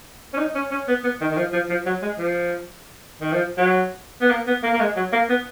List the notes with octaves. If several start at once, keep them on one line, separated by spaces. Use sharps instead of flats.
C#4
D#4
C#4
C#4
B3
B3
D#3
D#3
F3
F3
F3
F#3
G#3
F3
D#3
F3
F#3
B3
A#3
B3
A#3
A#3
G#3
F#3
A#3
B3